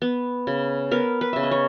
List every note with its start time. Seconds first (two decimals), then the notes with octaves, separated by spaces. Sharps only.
0.02 B3
0.47 C#3
0.91 B3 A#4
1.21 B4
1.33 C#3 E5
1.43 D#5
1.51 C#5